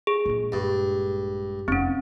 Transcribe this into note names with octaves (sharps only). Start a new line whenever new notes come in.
G#4
A#1 G#3
G2
F1 C4 C#4